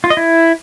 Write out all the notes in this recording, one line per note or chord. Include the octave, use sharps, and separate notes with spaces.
F4
D#5
E4